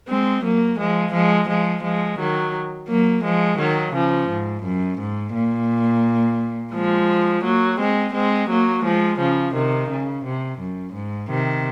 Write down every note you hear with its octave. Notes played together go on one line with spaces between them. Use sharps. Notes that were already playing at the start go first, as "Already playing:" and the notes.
G#3 C4
F#3 A#3
F3 G#3
F3 G#3
F3 G#3
F3 G#3
D#3 F#3
F#3 A#3
F3 G#3
D#3 F#3
C#3 F3
G#2
F#2
G#2
A#2
F3 G#3
F#3 A#3
G#3 C4
G#3 C4
F#3 A#3
F3 G#3
C#3 F3
C3 D#3
C#3
C3
F#2
G#2
C3 D#3